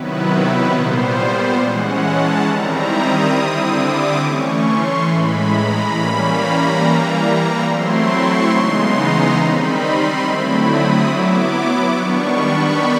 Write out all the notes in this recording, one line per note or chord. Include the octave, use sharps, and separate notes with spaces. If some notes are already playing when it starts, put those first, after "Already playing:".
Already playing: C3 D#3 F#3 B3 E4 B4
B4
A#2 G3 B3 C5
E3 G#3 C#4 F#5
A5
D#3 G3 C4 E4 A#5
D#6
D3 G3 C4 E4
D6
E3 A3 C#4 C#6
C6
A2 E3 G#3 B5
A#5
E3 G3 A#3 C#4 B5
A#5
E3 G3 A#3
F#3 A3 C4 E4 C6
C#6
C#3 E3 G#3 B3 D#4 C6
A#5
D#3 G3 C4 D#4 B5
C6
D3 F#3 A3 C4 E4 B5
D#6
F#3 B3 E4 D6
D#3 G3 B3 D4 C#6
B5